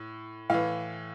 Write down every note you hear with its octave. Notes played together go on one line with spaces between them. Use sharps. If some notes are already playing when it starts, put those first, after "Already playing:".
Already playing: A2
A2 E3 F5